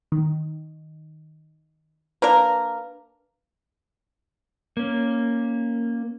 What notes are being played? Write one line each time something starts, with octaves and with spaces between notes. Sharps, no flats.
D#3
A#3 D4 A#4 B4
A#3 C#4